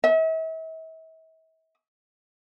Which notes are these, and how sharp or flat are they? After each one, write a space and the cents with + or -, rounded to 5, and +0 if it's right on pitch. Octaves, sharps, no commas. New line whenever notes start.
E5 -40